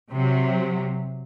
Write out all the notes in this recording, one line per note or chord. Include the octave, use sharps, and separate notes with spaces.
C3 F#3